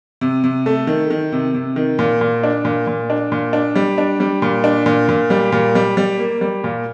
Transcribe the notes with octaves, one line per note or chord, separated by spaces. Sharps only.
C3
C3
A3
D#3
D#3
C3
C3
D#3
A#2
A#2
D4
A#2
A#2
D4
A#2
D4
G3
D4
G3
A#2
D4
A#2
A#2
G3
A#2
G3
G3
A#3
G3
A#2